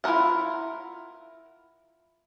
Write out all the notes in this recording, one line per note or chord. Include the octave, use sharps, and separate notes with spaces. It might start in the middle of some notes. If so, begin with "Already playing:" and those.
E4 F4 A4 A#4 F#5